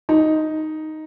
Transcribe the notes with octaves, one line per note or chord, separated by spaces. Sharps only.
D#4